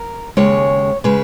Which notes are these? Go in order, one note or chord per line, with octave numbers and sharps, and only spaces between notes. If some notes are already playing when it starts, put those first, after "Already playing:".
Already playing: A#4
D#2 C#3 G#3 C#5
C#3 G#3 B4